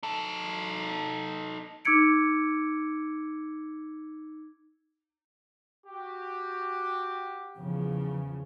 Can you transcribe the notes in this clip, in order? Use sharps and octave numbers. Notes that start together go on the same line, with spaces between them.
D#4 A4
D#4 D6 E6 G#6 C#7 D7
F#4 G4
E2 C#3 F3